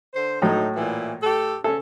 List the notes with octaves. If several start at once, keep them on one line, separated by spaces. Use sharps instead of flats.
D3 C5
D2 A2 F#3 A3 D#4
A#2 E3
A3 G4 A4
C#3 C#4 A4